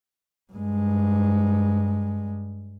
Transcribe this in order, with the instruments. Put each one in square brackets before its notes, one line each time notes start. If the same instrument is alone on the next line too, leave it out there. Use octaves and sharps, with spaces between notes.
[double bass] G2 G#3